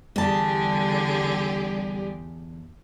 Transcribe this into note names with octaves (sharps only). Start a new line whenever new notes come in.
E2 D3 G3 G4 G#4 A5